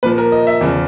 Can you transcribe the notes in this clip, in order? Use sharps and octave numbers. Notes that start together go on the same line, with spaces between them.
A#2 F3 B4
A#4
D#5
E5
E2 C#3 F3